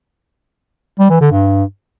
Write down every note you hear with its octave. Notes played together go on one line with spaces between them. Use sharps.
G3
E3
D3
G2